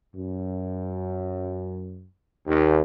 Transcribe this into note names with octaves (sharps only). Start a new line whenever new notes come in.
F#2
D#2